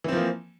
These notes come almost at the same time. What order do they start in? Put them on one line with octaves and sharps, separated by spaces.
E3 C4 F3 A#3